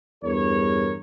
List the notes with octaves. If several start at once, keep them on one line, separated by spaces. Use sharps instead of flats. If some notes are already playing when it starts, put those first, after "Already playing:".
E2 G2 A#4 C#5